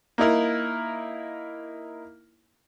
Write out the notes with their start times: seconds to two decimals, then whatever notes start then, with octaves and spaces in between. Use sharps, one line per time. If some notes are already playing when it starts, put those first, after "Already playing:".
0.18 A#3 D#4 E4 A#4